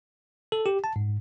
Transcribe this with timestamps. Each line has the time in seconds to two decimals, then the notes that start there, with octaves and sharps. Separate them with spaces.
0.52 A4
0.66 G4
0.84 A5
0.96 G#2